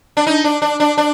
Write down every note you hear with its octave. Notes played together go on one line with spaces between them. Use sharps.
D4
D#4
D4
D4
D4
D4